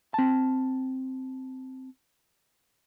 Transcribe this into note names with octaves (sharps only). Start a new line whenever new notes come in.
C4 A5